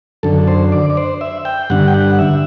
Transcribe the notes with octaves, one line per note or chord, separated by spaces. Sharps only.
F#2 D3 A4
C5
D5
D5
C5
E5
G5
G2 D3 F#5
G5
F#5
E5